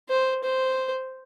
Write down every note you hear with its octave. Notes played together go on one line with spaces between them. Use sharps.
C5
C5